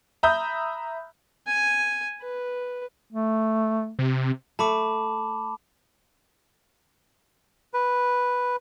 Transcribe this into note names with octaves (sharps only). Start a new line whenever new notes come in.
E5 A#5 B5 D#6 G6
G#5
B4
A3
C3
A3 A5 B5 D6
B4